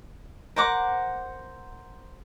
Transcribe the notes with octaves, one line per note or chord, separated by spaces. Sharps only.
A#4 C5 F#5 D6